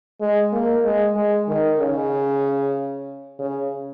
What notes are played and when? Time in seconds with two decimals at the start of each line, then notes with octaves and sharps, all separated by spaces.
0.21 G#3
0.53 A#3
0.84 G#3
1.16 G#3
1.48 D#3
1.80 C#3
3.39 C#3